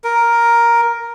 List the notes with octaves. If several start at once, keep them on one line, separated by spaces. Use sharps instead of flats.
A#4